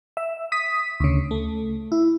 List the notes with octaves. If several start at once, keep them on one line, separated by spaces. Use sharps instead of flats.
E5
D#6 B6
D2 C#3
A3
E4